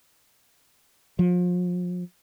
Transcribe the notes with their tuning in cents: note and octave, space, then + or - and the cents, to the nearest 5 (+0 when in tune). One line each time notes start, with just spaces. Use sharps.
F3 +35